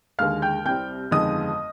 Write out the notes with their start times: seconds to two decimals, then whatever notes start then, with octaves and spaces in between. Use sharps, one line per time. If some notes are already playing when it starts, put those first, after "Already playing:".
0.19 D#2 D3 G#3 F5 F6
0.42 G5 G6
0.65 C2 C3 G3 C4 G5 G6
1.11 G1 F2 D#3 G#3 D#5 D#6